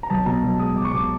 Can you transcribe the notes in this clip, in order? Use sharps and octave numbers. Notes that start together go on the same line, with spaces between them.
A#5
B1 A5
B2 A#5
B1
G#3 D#6
B1 D6
C#6
B2 D6